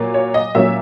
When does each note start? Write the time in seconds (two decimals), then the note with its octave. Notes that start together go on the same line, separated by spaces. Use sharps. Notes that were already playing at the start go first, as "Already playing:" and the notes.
Already playing: A#2 F#3 A#3
0.14 C#5
0.34 D#5
0.55 A#2 F#3 A#3 C#4 E5